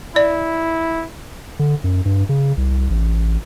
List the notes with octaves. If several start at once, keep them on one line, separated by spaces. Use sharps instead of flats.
E4 D5
D3
F#2
G2
C#3
C2
A1